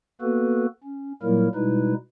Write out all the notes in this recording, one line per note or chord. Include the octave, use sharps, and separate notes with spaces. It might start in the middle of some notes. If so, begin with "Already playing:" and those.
A#3 B3 F#4 A4 B4
C#4
A#2 F#3 G3 A#3 E4 A#4
B2 G3 G#3 D#4 E4 B4